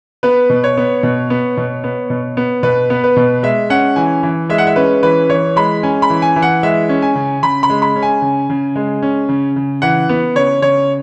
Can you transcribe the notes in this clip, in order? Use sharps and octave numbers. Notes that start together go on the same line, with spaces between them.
B3 B4
B2
C#5
B3
B2
B3
B2
B3
B2
B3
B2 B4
B3
B4
B2
G#3 E5
C#4 F#5
E3 G#5
E3
G#3 E5
F#5
E5
C#4 B4
E3 B4
E3 C#5
G#3 B5
C#4 G#5
B5
E3
G#5
E3
F#5
G#3 E5
C#4
G#5
C#3
C#3 B5
B5
G#3
B5
C#4
G#5
C#3
C#3
G#3
C#4
C#3
C#3
E3 F#5
B3
C#3 C#5
C#3 C#5